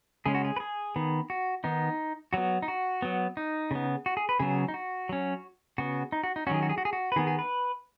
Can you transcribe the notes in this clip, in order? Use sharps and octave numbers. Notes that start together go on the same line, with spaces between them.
C#3 G#3 C#4 G#4
F#4
G#4
B4
G#4
D#3 B3
F#4
D#3 B3 D#4
F#3 B3 F#4
D#4
F#4
F#3 B3
D#4
C#3 B3
F#4
G#4
B4
C#3 F#3 B3 G#4
D#4
F#4
F#3 C#4
C#3 B3 F#4
D#4
F#4
D#4
D#3 F#3 C#4 F#4 G#4
F#4
G#4
F#4
G#4
F#4
B4
D#3 B3 G#4
G#4
B4